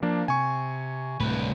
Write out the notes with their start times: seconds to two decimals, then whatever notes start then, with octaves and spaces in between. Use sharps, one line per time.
0.02 F3 A#3 D4
0.28 C3 G#5 C#6
1.20 D1 C2 A2 B4